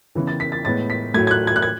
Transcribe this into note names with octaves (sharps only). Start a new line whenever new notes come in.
C#3 E3 B3
A6
B6
A6
A2 G#3 B3 A6
B6
A2 F#3 A3 G#6
G#6
F#6
G#6
F#6
G#6